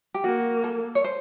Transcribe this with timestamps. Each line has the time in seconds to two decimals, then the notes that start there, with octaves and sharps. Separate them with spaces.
0.14 G4
0.24 A#3 F#4
0.64 A4
0.95 C#5
1.04 C5